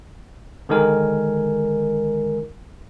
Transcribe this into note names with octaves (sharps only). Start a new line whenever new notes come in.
D3 D#3 G#3 A#4 G#5